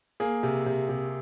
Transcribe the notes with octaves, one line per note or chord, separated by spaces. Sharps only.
A#3 G#4
C3
C3
C3